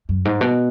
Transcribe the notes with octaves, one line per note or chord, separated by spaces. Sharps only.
F#2
G#2
B2